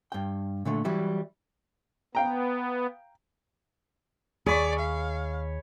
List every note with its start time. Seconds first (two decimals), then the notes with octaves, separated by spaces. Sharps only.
0.12 G2 G5
0.65 A#2 D3 A3
0.85 E3 F#3 G3 E4
2.15 B3 F5 G5 A#5
4.46 D#2 G#4 C#5 D5 B5 C#6
4.79 F5